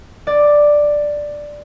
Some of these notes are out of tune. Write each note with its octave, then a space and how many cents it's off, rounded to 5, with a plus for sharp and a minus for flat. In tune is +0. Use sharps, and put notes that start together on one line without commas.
D5 +5